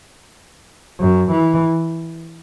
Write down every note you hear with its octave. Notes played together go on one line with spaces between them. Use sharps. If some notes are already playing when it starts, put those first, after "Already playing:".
F#2
E3